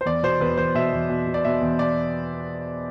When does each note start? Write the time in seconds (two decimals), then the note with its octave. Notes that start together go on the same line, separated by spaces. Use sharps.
0.01 C5
0.06 E2 D5
0.23 B2 C5
0.41 E2 B4
0.57 E2 C5
0.75 B2 E5
0.93 E2
1.10 B2
1.27 B2
1.34 D5
1.45 B2 E5
1.61 E2
1.79 B2 D5